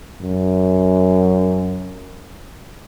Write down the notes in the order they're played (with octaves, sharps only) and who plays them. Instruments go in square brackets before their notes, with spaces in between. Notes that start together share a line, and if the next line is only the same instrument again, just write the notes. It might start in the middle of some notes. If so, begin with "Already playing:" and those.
[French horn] F#2